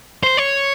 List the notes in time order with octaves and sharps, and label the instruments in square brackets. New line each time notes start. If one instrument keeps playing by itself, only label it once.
[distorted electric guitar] C5
C#5